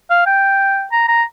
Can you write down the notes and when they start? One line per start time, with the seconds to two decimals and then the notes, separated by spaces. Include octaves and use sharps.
0.10 F5
0.26 G5
0.92 A#5
1.08 A#5